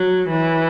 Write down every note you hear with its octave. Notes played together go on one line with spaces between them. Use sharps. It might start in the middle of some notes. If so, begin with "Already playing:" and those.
Already playing: F#3
E3